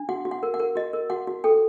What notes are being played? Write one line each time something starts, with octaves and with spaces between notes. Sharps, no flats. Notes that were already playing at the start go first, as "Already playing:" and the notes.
Already playing: D4
F#4 F#5
F#4
F#5
A#4
F#5
A#4
F#4 D#5
A#4
F#4 F#5
F#4
A4 G5